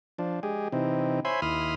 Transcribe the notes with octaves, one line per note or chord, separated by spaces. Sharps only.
F3 D4
G#3 G4 G#4
C3 E3 C4 D#4
C5 C#5 E5 G#5 B5 C6
D#2 E4 B5 C6 D#6 F6